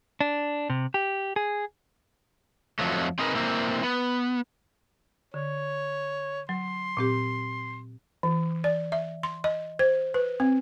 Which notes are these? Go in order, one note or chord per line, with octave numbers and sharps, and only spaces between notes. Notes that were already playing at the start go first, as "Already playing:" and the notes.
D4
C3
G4
G#4
F2 F3 F#3 A3
C4 D#4 G#4 A#4 B4
A#3 C4 E4
B3
D3 C#5
F#3 C6
A#2 C4 G4
E3
D5
E5
C6
D#5
C5
B4
C4